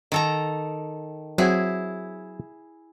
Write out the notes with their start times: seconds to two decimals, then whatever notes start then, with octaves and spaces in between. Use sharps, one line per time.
0.12 D#3 A4 A#5
1.38 F#3 C4 E4 F#4 G#4